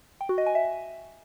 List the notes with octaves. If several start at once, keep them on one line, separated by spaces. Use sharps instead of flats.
G5
F#4
D#5
G#5
E5